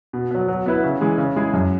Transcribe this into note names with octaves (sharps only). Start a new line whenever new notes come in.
B2
F#3 B3
F#3
B3 E4 B4
C#3
E3 G#3
C#3
G#3 E4 G#4
F#2